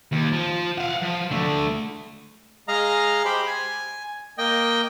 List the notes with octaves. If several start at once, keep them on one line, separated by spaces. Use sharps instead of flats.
D#2
F3
F5 F#5
F3
D3 A3
G#3 D#5 F5 A#5
G4 C5 B5
G#5
A#3 D#5 G5